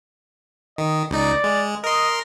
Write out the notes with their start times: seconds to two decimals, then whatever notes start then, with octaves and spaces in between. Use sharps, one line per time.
0.78 D#3 D#5
1.11 C#2 D#4 D5
1.44 G#3
1.84 A#4 D#5 C6